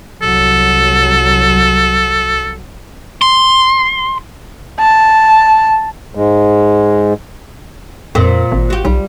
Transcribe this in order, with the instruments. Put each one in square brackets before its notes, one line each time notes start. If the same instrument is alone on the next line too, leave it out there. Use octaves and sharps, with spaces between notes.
[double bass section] C2 F#3 [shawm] A4
[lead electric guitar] C6
[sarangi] A5
[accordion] G#2 G#3
[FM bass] F2 [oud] A#2 C4
[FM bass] G#1
[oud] F#4 G4
[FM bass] B1 [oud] G3